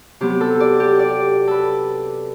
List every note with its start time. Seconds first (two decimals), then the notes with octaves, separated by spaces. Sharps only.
0.21 C3 F#3 B3 G4
0.41 A4
0.60 D5
0.80 G4
0.99 D5
1.47 A4 B4